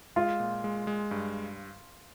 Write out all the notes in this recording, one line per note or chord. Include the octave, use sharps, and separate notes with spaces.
G#3 F4
A#2
G#3
G#3
G2